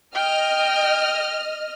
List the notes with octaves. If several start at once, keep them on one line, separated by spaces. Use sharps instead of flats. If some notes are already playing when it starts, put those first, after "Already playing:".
D#5 G5 F6